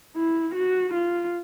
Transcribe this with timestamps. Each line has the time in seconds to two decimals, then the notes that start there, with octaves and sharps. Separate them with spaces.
0.16 E4
0.55 F#4
0.94 F4